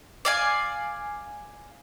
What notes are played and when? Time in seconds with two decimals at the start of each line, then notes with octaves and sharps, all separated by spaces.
0.25 D5 F5 G#5